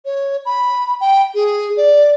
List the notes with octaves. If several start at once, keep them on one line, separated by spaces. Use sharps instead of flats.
C#5
B5
G5
G#4
D5